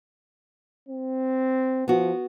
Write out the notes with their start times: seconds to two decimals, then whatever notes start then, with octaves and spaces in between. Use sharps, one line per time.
0.89 C4
1.88 F3 B3 F#4